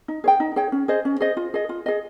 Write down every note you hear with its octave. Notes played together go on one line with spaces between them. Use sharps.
D#4
G#4 C#5 G5
D#4
G#4 C#5 G5
C#4
G#4 C5 D#5
C#4
G#4 C5 D#5
F4
G#4 D#5
F4
G#4 D#5